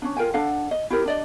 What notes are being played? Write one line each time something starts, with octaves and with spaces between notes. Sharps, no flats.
C#4 D4
F4 A#4 G5 G#5
D4 A4 F5 F#5
D#5
E4 G4 A#4
D4 D5 D#5